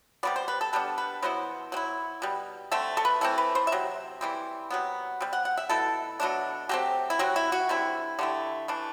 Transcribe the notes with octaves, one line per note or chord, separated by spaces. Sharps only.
C3 G3 B3 D5
C5
B4
A4
E3 G3 B3 D4 A4
B4
B2 F#3 B3 E4 C5
F#3 C4 E4
B2 G3
D3 A3 C4 E5
A4
B4
E3 A3 C4 A4
B4
C5
E5
C3 F#3
E3 G3 C4
C3 F#3 B3
C3 G3
F#5
F#5
E5
B2 A3 E4 A4
B2 F#3 A3 D4
F#3 A3 C4 G4
E4
C3 F#3 C4 F#4
E4
F#4
D3 G3 C4 E4
D3 A3 E4 G4
E3 A3 D4